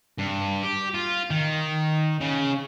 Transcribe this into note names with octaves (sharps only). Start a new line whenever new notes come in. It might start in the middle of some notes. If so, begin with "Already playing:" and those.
G2
G4
F4
D#3
C#3